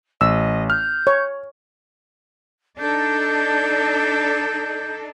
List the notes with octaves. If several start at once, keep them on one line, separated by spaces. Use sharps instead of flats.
A1 D#5 E6
F6 G6
C#5
D4 D#4 A4 G6